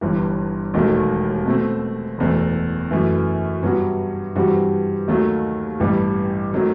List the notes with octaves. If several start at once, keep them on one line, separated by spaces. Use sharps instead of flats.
G1 G2 E3
E1 D#2 D#3 A3
B2 A3 C4
F#1 E2 B2 A3
F#2 E3 A3
G2 F#3 B3 F#4
G2 E3 G3 C4 F#4
D#2 D#3 F#3 A3
A1 G2 E3 G3
D#3 F#3 A3 C4